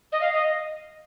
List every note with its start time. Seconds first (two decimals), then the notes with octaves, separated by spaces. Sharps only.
0.12 D#5
0.21 F5
0.33 D#5